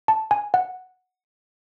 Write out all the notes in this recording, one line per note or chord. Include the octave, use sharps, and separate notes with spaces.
A5
G#5
F#5